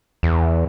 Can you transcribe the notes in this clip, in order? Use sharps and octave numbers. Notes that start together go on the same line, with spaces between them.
E2